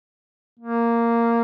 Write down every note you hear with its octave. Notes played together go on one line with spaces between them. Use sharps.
A#3